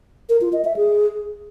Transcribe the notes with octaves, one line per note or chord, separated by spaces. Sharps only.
A#4
F4
D#5
E5
G#4